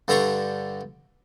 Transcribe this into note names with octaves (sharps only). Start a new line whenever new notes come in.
G2 D3 A4 A#5 C6 C#6